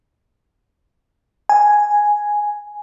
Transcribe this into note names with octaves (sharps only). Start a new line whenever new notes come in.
G#5